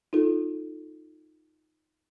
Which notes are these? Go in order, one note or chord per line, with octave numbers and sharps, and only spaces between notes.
D#4 F4 A4